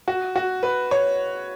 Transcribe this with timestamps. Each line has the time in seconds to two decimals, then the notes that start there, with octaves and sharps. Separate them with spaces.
0.08 F#4
0.36 F#4
0.63 B4
0.91 C#5